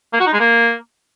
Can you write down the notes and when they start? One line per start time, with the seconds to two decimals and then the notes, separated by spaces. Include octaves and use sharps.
0.13 A#3
0.20 F#4
0.27 D#4
0.33 G#3
0.40 A#3